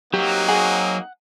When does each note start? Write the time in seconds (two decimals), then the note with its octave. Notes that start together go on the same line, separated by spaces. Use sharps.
0.14 F#3 A#3 C4 D#4 G4
0.49 G#4 F#5